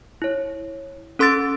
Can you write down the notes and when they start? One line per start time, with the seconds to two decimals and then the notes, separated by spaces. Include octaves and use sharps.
0.22 E4 C#5
1.19 C#4 A4 C6 E6 A6 D7